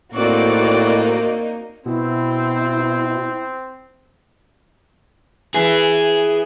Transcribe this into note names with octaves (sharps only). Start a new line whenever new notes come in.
A2 A#3 C4 D#4 F#4 D5
B2 C4 E4
E3 G#4